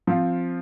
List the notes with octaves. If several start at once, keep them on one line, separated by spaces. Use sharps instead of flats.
F3 C4 F4